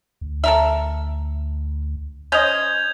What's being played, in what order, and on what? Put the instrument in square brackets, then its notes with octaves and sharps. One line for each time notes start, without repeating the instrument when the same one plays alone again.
[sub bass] D2
[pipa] A4 A#4 E5
[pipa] C#4 C5 D#5 [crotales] G6 G#6 F7